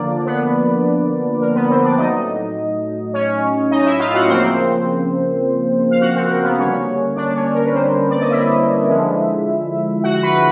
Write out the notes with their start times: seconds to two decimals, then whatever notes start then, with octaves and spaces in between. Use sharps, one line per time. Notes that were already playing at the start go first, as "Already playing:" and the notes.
Already playing: D3 F3 A#3 D4 D5
0.26 B3 B4
1.41 A#4
1.55 B3 B4
1.69 C4 C5
1.84 D4 D5
1.98 A2 F#3 A3 D#4 D#5
3.13 C#4 C#5
3.71 D#4 D#5
3.85 E4 E5
3.99 F4 F5
4.14 F#4 F#5
4.28 C#3 F3 A#3 C4 C5
5.91 F5
6.01 F#4 F#5
6.15 C4 C5
6.29 A#4
6.44 B3 B4
6.58 D3 G3 A#3 C#4 C#5
7.16 D4 D5
7.35 C#4 C#5
7.54 A#4
7.65 B4
7.74 C4 C5
8.10 D5
8.21 D#5
8.31 E4 E5
8.88 D3 F3 G#3
10.04 F#4 F#5
10.23 B4 B5